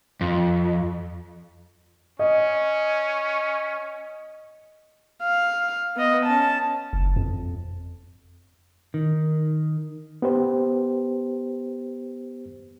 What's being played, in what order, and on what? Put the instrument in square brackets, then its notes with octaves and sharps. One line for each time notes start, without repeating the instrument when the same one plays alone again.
[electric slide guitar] F2
[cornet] C#4 [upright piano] D#5
[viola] F5
B3 D#5
C#4 A5
[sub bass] F#1
F2
[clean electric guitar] D#3
[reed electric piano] B3 G4 C5